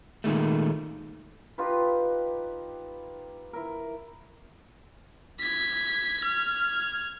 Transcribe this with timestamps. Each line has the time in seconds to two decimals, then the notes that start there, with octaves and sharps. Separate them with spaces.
0.24 A#2 D#3 G#3 A3
1.58 D#4 F4 G4 B4
3.53 E4 A#4
5.40 G#6 B6
6.21 F6 G#6